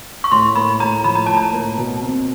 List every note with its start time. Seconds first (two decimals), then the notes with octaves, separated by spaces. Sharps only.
0.24 C#6
0.32 A2 C6
0.56 A#3 B5
0.80 A2 A#5
1.04 F3 B5
1.15 A#5
1.26 A2 A5
1.37 A#5
1.53 A#3
1.78 B2
2.02 C4